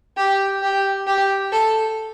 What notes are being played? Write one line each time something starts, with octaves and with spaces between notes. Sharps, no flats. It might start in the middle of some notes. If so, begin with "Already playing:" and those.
G4
G4
G4
A4